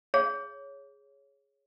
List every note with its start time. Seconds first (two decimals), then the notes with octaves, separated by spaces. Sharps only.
0.14 G#4 C#5